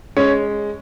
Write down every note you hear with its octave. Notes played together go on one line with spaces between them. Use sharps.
G#3 C#4 C#5